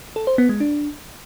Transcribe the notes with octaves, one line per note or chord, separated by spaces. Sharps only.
A4
C5
B3
G#3
D4